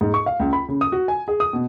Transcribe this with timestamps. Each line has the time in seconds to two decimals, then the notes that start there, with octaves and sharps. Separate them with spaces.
0.01 G#2
0.14 C#6
0.26 F5
0.39 C#2
0.53 B5
0.69 C#3
0.81 D#6
0.92 F#4
1.08 G#5
1.28 G#4
1.40 D#6
1.53 B2